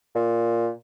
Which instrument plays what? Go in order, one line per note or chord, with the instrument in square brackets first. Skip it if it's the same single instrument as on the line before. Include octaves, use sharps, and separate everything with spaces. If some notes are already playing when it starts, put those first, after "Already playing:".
[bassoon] A#2